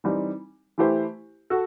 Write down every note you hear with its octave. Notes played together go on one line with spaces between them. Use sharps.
E3 G3 C4 D#4
E3 A3 E4 G4 C5
F#4 A4